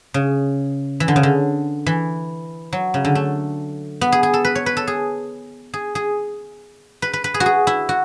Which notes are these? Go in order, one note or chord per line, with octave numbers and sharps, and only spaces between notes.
C#3
E3
D3
C#3
D3
E3
F#3
C#3
D3
A3
B3
G#4
G#4
A4
B4
C#5
B4
A4
G#4
G#4
G#4
B4
B4
B4
G#4
F#4
G#4
E4
F#4